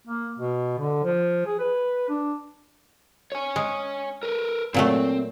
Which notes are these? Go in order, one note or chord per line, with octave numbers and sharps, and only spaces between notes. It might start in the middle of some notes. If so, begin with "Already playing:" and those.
A#3
B2
D3
F3
G#4
B4
D4
C#5 G#5
G#3
A#4 B4
A#2 F#3 A3 C4